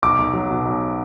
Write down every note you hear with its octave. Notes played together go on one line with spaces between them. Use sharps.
B1 D6
B1
F#3
B2
B1